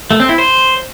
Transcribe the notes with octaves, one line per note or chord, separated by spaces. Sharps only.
A3
C4
E4
C5